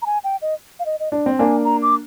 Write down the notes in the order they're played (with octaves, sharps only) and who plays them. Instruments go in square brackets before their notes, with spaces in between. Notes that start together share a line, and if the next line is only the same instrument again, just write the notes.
[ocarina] A#5
G#5
G5
D#5
F5
D#5
D#5
[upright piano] D4 [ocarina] D5
[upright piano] C4
[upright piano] A#3 D4 [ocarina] G#5
[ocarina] A#5
D6